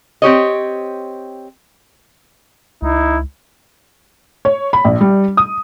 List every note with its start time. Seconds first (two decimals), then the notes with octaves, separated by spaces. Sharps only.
0.22 C4 G4 C#5 D#5
2.82 C#2 D#4 E4
4.45 C#5
4.73 B5
4.85 A#1
5.01 G3
5.37 D#6